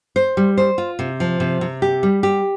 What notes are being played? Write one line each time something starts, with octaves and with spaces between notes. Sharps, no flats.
C5
G3
C5
F4
C3
F3
C3
C3
G4
G3
G4